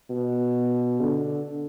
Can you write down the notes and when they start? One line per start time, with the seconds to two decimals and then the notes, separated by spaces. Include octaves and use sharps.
0.10 B2
1.00 D3